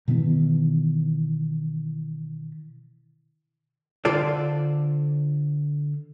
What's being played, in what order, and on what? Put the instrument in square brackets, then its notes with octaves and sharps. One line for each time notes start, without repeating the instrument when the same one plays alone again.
[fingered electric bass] B2 D#3 E3 B3
[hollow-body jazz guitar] D3 F4 A4 C5 D5